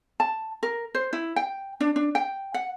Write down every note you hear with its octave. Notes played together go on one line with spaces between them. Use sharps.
A5
A#4
C5
E4
G5
D4
D4
G5
F#5